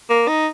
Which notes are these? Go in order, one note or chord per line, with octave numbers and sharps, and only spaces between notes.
A#3
D#4